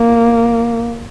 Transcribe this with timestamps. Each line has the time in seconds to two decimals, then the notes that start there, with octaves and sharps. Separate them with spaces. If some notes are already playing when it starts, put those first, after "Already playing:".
Already playing: A#3